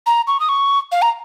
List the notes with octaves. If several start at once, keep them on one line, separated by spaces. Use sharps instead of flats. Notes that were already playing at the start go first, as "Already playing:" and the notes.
A#5
C#6
D#6
C#6
F5
A#5